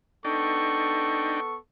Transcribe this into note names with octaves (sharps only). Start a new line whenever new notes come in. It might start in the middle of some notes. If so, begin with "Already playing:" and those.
B3 D4 D#4 A4 G5 C#6